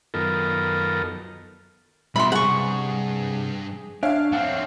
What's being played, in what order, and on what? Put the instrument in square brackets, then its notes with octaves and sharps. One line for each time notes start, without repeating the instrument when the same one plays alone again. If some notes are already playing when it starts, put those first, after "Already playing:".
[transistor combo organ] F#2 D#3 B3 F4 A4 A#4
[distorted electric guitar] B1 E4 [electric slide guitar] G3 B3 F4 [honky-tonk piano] E5 [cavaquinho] B5 C6
[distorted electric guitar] C#2 G2 [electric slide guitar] C3 A#5 [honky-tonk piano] G#4 [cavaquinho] F#5 C#6
[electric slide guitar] D4 [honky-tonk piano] C#5 E5 F5
[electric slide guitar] F#2 F#5 [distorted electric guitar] C4 D4